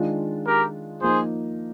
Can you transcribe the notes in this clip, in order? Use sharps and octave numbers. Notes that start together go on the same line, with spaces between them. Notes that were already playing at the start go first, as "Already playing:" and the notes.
Already playing: D#3 G#3 D4 F4
G4 A#4
F3 A#3 D#4 G#4 C5